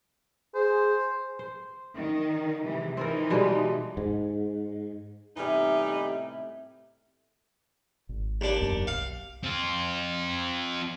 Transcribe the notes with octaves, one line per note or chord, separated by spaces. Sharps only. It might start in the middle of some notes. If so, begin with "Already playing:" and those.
G#4 C5
C5
D#3
C3 E3 G#3
E3 C4 D#4 F4 A#4
B2 G3 G#3
G#2
A2 C3 E3 G3 B3 D#4
G#1
D#2 D4
E1 F#2 B3
B1 F5
C4 F4